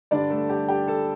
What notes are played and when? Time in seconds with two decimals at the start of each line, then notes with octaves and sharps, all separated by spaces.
0.11 G2 D3 G3 D4 D5
0.30 A3 A4
0.49 G4
0.68 G4 G5
0.88 A4 A5